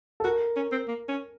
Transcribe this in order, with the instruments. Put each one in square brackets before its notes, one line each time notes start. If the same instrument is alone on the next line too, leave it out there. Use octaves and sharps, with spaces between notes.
[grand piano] A4
[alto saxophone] F#4 [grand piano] A#4
[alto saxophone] C#4
C4
A#3
C#4